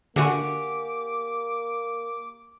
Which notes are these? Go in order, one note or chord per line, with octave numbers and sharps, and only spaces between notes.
D3 A#3 F#4 G4 F#5 G#5 D6